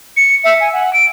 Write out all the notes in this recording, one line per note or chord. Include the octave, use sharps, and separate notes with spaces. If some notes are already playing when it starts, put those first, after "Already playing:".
C#7
E5
G#5
F#5
D7